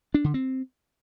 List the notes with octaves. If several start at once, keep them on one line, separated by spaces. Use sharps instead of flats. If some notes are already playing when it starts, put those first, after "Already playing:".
D4
D3
C4